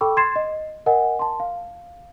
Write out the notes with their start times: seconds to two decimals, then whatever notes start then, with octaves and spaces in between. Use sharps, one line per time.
0.01 A4 G5 B5 C#6 D6 E6
0.17 C6 G#6 A6 C7 E7
0.36 D#5
0.86 A#4 D#5 F#5 G#5
1.19 A5 C6
1.40 F5